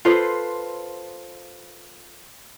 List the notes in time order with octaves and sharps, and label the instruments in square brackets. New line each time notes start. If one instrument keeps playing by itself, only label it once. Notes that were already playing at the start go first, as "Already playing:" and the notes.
[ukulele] F4 A4 B4 C5